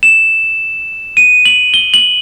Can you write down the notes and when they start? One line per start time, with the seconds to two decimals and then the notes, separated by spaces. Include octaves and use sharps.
0.03 E7
1.17 D#7
1.45 F#7
1.74 G7
1.94 F#7